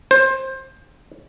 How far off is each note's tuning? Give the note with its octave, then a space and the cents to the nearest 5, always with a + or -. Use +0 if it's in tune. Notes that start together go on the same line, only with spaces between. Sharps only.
C5 +20